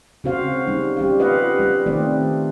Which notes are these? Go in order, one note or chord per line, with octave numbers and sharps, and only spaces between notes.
C#3 C4 F#4 C5 F5
G3 C#4 D#4
G3 G4 F5
F4 B4 D#5 F5 F#5
G3
D#3 A3 C4 D#4 D5